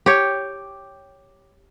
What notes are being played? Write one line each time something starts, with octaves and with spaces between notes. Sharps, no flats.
G4 C#5